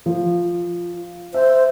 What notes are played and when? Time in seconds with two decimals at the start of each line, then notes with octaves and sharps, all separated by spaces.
0.06 F3
1.34 C5 E5